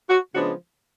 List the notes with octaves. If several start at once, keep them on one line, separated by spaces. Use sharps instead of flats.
F#4
C#3 F3 G#3 B3 D4 F#4